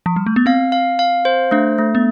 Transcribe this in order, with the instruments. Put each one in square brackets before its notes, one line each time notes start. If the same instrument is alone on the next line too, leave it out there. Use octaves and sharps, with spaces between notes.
[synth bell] F3
G3
A3
B3
[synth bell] C4 [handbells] F5
[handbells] F5
F5
C5
[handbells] A3 [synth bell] D4
[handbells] A3
[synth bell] B3